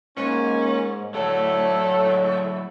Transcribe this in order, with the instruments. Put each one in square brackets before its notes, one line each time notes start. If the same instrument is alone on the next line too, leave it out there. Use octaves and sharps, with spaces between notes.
[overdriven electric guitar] G#2 [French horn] A#3 [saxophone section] C#4
[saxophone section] A2 D3 A3 [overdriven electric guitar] F#3 E4 [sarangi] A4 [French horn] C#5